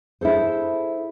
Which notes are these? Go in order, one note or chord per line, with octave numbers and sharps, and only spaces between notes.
E4 G#4 A4 C5